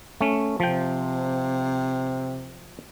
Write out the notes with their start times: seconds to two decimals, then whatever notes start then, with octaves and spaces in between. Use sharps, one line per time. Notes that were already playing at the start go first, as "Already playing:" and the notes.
0.21 A3 C#4
0.60 C3 F3 G5